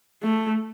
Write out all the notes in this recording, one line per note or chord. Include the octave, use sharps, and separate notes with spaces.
A3